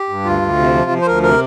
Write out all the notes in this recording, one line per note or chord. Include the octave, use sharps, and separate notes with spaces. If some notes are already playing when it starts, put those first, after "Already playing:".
Already playing: G4
G2
D2 F4
D2
C3
F3
F3
C5
D2 A#4
C3 A#4